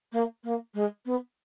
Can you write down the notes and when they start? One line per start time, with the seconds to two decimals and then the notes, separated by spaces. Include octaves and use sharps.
0.12 A#3
0.44 A#3
0.74 G#3
1.05 B3